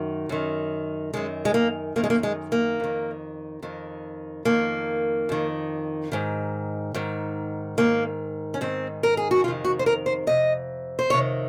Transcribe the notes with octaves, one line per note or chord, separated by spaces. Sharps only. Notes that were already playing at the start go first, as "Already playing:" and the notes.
Already playing: F#2 D#3
F#2 D#3
F#2 D#3 G#3
G#3
A#3
F#2 D#3 A#3
G#3
A#3
G#3
A#3
F2 D#3
F2 D#3
F2 D#3 A#3
F2 D#3
G#2 D#3
G#2 D#3
G#2 D#3 A#3
C#4
G#2 D#3 C4
A#4
G#4
F#4
F2 C3 D#3 F4
F#4
C5
A#4
C5
F2 C3 D#5
C5
F2 C3 D#3 C#5